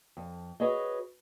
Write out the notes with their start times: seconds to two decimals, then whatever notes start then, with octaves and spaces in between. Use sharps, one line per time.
0.17 F2
0.60 F#4 G#4 B4 C#5 D#5